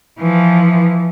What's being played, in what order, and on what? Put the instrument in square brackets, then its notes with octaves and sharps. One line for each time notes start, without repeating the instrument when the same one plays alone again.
[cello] E3 F3